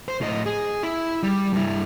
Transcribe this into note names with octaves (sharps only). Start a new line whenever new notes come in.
C5
A2 D#5
G#4
E4
G3
G2 E4